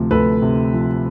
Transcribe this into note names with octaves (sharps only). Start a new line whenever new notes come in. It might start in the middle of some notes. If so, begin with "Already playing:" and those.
Already playing: D2 C3 F3
D2 A4 B4
C3
F3